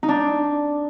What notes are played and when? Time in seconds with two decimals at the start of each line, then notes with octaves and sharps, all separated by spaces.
0.03 D#4
0.09 D4